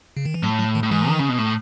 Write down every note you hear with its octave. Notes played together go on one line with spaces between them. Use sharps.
C#3
D#3
E3
A2 F#3
F#3
D#3
A2
G#2 E3
D#3
C#3
B2
A2